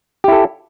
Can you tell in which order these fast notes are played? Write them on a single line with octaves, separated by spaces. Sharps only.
G4 E4 A4